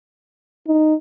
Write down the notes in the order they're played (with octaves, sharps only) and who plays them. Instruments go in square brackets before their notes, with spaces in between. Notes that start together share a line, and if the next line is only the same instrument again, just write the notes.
[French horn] D#4